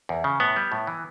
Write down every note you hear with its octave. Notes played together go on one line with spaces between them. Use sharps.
E2
C#3
A2 B3
G3
A2
E3